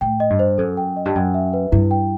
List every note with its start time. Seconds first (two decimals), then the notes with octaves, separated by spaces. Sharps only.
0.01 A2 G5
0.20 D#5
0.30 G2
0.39 C5
0.58 F#2 A4
0.77 G5
0.96 D#5
1.05 G2
1.15 F#2 G5
1.34 E5
1.53 B4
1.72 G2 E4
1.91 G5